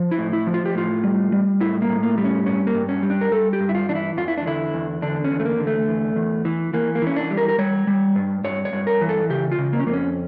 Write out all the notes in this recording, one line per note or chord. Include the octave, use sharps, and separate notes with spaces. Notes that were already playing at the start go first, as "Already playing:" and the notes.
Already playing: F3
E4
A2
E4
F3
F4
G4
A2 F4
G3
G3
A2 E4
A#3
A2
A#3
G3
C#4
G2 C#4
A#3
G2
C#4
G3
D4
A#4
G3 A4
G4
G2
E4
F4
E3 D4
E4
E2 F4
E4
D4
D3 E4
E2
D3 D4
C#4
E2
A3
A#3
D3
A3
E2
E2
E3
E3 A#3
A#3
E3 C#4
D4
G3
A#4
A#4
G3 C#5
G3
G2
G2 C#5
C#5
G2
A#4
E3
A4
C#3 G4
F4
C#3
A#3
C#4
F2 A#3
C#4